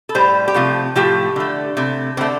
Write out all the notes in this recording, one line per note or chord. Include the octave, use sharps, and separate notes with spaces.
A4
A2 G3 C5
G4
C3 F3 A3 F4
A2 F3 A3 G4
D3 A3
C3 A3
D3 A3 C4